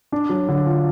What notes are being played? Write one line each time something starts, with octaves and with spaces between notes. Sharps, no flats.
D4
F#3
D3
F4